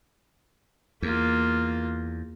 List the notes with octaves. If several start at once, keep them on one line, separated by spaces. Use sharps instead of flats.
E2 A#3 F4